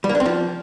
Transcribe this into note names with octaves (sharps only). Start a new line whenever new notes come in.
G3
A#3
D4
C4
F3